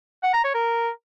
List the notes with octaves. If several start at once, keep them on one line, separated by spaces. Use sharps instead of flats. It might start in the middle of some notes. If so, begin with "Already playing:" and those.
F#5
A#5
C#5
A#4